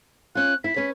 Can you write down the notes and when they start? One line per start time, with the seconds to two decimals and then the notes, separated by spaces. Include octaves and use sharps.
0.35 C#4 F4 F#6
0.64 E4 B6
0.76 C#4 B4 C#5